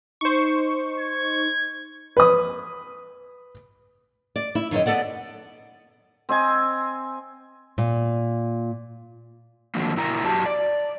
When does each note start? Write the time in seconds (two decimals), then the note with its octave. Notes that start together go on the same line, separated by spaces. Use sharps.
0.21 D#4 C5 C#6
1.00 G#6
2.17 B4 D#6
4.36 D5
4.55 E4
4.71 F#2 D#3 F4 C#5 D#5
4.86 B3 A4 D5 F#5
6.29 C4 D#5 G#5
7.78 A#2
9.75 D3 D#3 F3 F#3 A#3
9.97 A#2 E4 A#4 A#5
10.24 F#2 F#4 G4 A5
10.46 D5